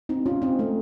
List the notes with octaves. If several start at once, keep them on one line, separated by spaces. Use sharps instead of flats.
C4 D#4
C#4 F4
C4 D#4
A3